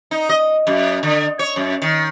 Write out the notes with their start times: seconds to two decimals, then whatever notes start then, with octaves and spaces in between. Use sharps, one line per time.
0.11 D#4
0.29 D#5
0.67 F#2
1.03 D3
1.39 C#5
1.56 F#2
1.82 D#3